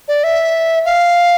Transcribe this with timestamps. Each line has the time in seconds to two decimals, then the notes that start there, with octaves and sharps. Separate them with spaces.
0.08 D5
0.24 E5
0.85 F5